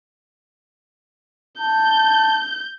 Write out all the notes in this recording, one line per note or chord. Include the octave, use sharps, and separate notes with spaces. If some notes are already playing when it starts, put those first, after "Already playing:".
A5 G6